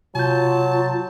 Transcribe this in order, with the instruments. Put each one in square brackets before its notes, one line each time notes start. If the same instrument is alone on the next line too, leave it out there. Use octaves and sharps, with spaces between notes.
[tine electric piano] C3 G6 [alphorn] F#3 [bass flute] F4 [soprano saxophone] A5